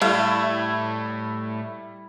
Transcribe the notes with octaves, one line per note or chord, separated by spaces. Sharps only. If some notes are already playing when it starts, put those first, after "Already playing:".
A2 G3 A3 E4 F5